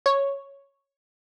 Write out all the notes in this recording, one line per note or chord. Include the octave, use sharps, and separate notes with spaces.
C#5